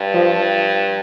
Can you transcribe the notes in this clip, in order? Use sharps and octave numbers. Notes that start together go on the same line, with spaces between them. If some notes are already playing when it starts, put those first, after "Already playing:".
Already playing: G2
F3